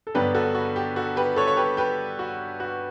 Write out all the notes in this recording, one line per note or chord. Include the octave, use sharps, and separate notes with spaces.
A4
G2 D3 F#3 B3 D4 G4 B4
F#4 A4
F#4
G4
F#4 A4
G4 B4
A4 C#5
C#5
G4 B4
G4 B4
F#4
F#4